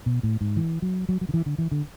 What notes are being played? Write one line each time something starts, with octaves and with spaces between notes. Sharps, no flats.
B2
A2
G#2
E3
F#3
F#3
F#3
D3
E3
D3
E3
D3